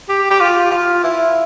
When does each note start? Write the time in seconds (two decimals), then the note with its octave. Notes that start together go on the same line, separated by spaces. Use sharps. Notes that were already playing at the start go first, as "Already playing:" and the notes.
0.09 G4
0.30 G4
0.40 F4
0.71 F4
1.03 E4